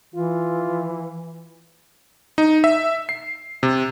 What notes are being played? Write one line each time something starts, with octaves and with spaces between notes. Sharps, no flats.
E3 F4
D#4
E5
C7
C3